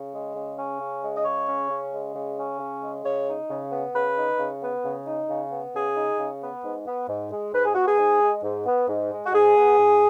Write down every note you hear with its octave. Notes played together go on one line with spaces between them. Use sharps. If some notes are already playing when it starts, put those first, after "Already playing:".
Already playing: C#3
G#3
C#3
C#4
C#3
G#3
D#5
C#3 C#5
C#4
C#3
G#3
C#3
C#4
C#3
G#3
C#3 C#5
D#4
C#3
B3
C#3 B4
D#4
C#3
B3
C#3
D#4
C#3
B3
C#3 G#4
D#4
C#3
B3
G#2
B3
G#2
G#3
G#2 B4
G#4
B3 F#4
G#4
G#2
G#3
G#2
B3
G#2
G#3
F#4
G#2 G#4
B3
G#2